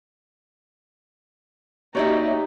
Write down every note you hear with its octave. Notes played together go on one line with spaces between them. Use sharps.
A#3 D#4 F#4 G4 C#5 D5 E5